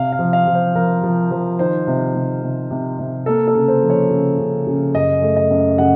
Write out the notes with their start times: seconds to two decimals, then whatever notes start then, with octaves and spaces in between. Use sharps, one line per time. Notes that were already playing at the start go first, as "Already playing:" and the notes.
Already playing: C3 F5
0.12 F5
0.19 F3
0.33 F5
0.47 F3
0.54 C5
0.75 F3 A#4
1.03 F3
1.31 F3
1.59 D#3 C5
1.87 C3
2.15 C3
2.43 C3
2.71 C3
2.99 C3
3.26 A#3 A4
3.48 A4
3.55 C#3
3.68 C5
3.83 F3
3.90 C#5
4.10 C#3
4.39 C#3
4.67 C#3
4.94 F#2 D#5
5.22 A3
5.36 D#5
5.51 F#2
5.78 C#3 F#5